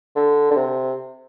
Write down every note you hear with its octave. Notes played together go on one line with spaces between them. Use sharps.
D3
D3
C3